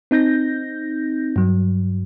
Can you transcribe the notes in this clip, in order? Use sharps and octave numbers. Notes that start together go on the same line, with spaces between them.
C4 D#4 G6 A#6
G2 F#3